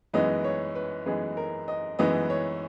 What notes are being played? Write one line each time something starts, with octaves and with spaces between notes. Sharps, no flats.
F#2 E3 G#3 B3 D#4 D#5
C#5
B4
F#2 E3 G#3 B3 D#4 G#4
A#4
D#5
F#2 E3 G#3 B3 D#4 D#5
C#5